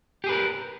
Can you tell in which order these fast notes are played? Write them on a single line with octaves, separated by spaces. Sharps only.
G4 G#4 B4 A#4